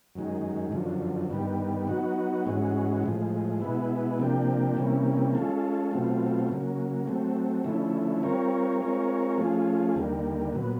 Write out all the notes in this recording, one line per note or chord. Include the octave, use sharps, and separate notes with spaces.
F#2 D#3 G#3
F#2 D3 F3
G2 D#3 G3 B3
F#3 B3 D#4 F#4
G#2 E3 G#3 C#4 F#4
A2 F3 G#3
B2 G#3 B3 E4
C3 F3 A#3 D4 G4
C3 E3 G3 A#3 C#4
G#3 C#4 F4 A4
B2 F#3 A3 C4 F4
C#3 F#3 A#3
F#3 A3 C4
D3 F3 A3 C#4 E4
G3 C4 F4 A#4 C#5
G#3 C4 F4 A#4 C#5
F3 A3 C#4 F4 G#4
D#2 D3 G3 A#3
A#2 F#3 B3